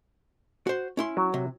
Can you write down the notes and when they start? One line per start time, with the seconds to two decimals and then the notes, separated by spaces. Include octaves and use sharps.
0.67 F#4 C5
0.97 C#4 E4 C6
1.17 F#3
1.34 C3